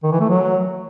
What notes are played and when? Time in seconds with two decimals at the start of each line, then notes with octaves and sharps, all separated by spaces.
0.03 D#3
0.12 E3
0.20 A3
0.29 F#3